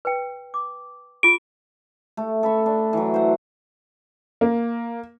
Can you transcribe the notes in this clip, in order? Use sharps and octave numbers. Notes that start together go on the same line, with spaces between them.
B4 G5
D6
F4 G#4 D7
A3
A4 B5 C#6
D4
E3 F#3
C5 F#5
A#3